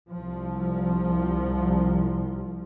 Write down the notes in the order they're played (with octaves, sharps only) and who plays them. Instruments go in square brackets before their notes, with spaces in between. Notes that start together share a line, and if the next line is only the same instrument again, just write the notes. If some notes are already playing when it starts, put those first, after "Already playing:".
[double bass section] C2 F3